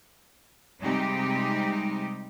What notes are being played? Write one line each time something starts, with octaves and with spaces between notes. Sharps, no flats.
C3 G3 G#3 C4 D#4 G4